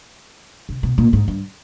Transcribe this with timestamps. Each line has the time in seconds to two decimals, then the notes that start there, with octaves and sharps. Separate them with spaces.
0.69 C3
0.83 B2
0.98 A#2
1.13 G#2
1.28 G2